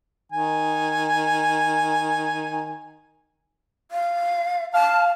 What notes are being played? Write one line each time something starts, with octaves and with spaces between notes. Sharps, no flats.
D#3 G#5
F5
F5 A5